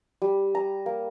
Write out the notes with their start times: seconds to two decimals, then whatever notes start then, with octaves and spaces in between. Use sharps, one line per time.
0.22 G3
0.55 A#5
0.86 A#3